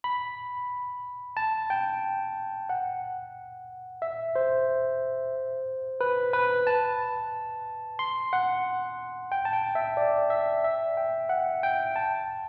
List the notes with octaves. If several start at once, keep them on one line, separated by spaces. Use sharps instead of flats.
B5
A5
G5
F#5
E5
C5
B4
B4
A5
C6
F#5
G5
A5
G5
E5
D5
E5
E5
G5
F#5
G5
A5